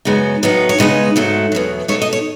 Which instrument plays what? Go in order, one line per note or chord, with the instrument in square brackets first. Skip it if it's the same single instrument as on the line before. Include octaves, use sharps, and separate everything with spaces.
[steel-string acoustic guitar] F#2 C#3 G#3 B3 D#4
A2 F#3 B3 D#4
C#5
E2 C#3 G#3 B3 D#4 D#5
G#2 F#3 A3 D#4
E2 B2 F#3
B2 A3 D#4 C#5
D#5
C#5